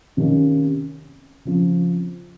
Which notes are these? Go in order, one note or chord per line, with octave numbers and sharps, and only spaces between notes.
C3 D#3 A#3 C#4
C#3 F3 C4